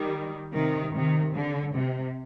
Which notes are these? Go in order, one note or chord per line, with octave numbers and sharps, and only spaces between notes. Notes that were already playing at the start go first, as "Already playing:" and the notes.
Already playing: D#3 G3
C3 D#3
C3 D#3
D3
C3